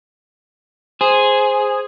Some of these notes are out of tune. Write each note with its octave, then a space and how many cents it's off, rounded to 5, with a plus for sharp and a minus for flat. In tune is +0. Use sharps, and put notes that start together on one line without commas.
G#4 +0 C5 +0